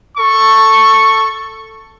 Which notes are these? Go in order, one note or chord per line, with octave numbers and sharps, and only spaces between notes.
A4 C#6